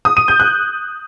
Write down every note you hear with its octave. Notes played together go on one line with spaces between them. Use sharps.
D#6
D#7
G6
F#6